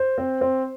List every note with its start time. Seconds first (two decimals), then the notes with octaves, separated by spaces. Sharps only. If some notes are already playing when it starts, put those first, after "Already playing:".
Already playing: C5
0.18 C4
0.41 C4